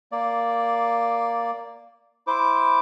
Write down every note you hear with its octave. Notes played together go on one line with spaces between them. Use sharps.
A#3 D5
E4 C5 D6